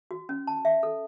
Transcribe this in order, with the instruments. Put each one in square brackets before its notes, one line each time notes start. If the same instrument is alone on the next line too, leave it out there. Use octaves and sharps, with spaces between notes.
[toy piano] F#4
C#4
A5
E5
A4